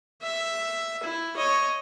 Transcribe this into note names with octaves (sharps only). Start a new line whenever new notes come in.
E5
E4
C#5 D#5